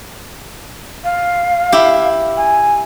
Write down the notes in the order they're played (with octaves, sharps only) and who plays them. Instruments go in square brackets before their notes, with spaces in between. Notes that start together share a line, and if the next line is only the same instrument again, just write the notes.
[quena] F5
[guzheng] E4 G4
[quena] G#5